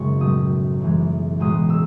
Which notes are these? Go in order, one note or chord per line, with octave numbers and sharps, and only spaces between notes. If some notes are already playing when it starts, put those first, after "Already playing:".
Already playing: G#1 F#2 C#3 G#3 C#6
B1 A2 F#3 A3 D#6
F#1 F#2 E3 G#3
B1 A2 G#3 D#6
E6